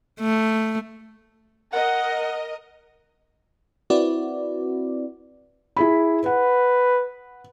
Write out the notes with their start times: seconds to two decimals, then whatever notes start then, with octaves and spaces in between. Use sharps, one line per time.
0.20 A3
1.73 A#4 D#5 F#5
3.90 C4 E4 F#4 B4 D5
5.76 E4 G#4 B5
6.26 B4 F#5